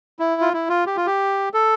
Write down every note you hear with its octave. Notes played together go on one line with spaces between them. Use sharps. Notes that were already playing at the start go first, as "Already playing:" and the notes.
E4
F4
E4
F4
G4
F4
G4
A4